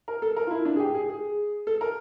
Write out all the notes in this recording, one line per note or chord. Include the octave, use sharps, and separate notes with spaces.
A#4
A4
A#4
F4
E4
D4
G#4
G4
G#4
G#4
A4
A#4